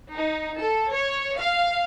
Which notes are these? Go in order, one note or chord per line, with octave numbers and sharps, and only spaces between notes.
D#4
A4
C#5
F5